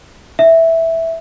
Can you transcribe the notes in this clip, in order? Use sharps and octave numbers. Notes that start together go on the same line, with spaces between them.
E5